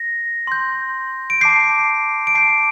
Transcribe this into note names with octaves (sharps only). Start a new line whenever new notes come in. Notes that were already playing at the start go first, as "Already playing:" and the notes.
Already playing: A#6
C6 G6
D7
A5 D6 G6 C7
D7
A5 D6 G6 C7